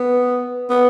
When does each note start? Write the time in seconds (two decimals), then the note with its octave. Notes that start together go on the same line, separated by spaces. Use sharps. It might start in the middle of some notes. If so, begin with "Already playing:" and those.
Already playing: B3
0.70 B3